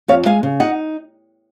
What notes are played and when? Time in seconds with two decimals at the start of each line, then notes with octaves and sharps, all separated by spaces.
0.08 F2 C#5 F5
0.26 G#3 F5 G#5
0.43 C#3
0.60 D#4 D#5 F#5